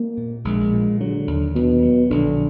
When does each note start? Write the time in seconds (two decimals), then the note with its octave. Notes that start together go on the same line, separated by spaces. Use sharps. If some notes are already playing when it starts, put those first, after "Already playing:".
Already playing: A#3
0.17 A#2
0.45 A#1 G#3
0.73 A#2
1.00 D3 F#3
1.27 D#2
1.55 D#2 B2
1.83 F#3
2.10 A#1 D3